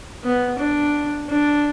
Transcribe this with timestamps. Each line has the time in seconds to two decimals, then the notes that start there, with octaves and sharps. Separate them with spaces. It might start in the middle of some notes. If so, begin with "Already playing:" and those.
0.24 B3
0.59 D4
1.29 D4